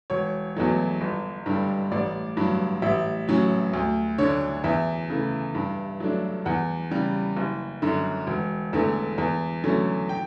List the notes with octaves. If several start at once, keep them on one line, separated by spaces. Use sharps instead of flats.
E1 C#5
E2 B2 F#3 A3
G1
G2 D3 G3
A1 D5
G2 F#3
A1 E5
A2 F#3 C#4
D2
D3 A3 D4 C#5
E2 E5
C#3 E3 A3
G2
F#3 A3 D4
E2 F#5
C#3 G3
F#1
F#2 D3
E1
E2 D3 A3
E2
D3 F#3 A3 C#4
G5